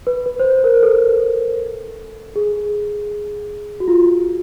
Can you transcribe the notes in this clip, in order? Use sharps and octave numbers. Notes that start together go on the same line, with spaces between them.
B4
B4
C5
B4
A#4
A4
G#4
F#4
F4